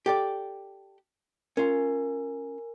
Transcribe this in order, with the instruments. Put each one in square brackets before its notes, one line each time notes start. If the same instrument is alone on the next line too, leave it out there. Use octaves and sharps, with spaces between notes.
[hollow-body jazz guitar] G4 A4 D5
[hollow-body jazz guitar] C#4 F4 [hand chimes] A#4 G#5